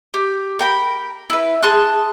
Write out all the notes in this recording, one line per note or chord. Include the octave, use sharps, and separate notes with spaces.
G4
A#4 G5 B5
E4 B4
G#4 A5 C6 F#6